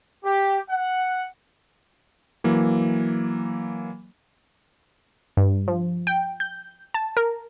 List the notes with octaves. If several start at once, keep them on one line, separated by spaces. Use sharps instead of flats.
G4
F#5
E3 F#3 A#3
G2
F3
G5
G6
A5
A#4